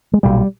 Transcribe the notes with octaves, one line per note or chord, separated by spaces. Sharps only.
G#3
B1 A#2 G3